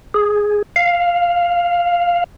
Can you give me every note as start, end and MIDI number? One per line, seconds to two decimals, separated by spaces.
0.14 0.62 68
0.76 2.24 77